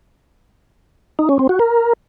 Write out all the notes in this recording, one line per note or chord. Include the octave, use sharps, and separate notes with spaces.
D#4
C#4
C4
F#4
A#4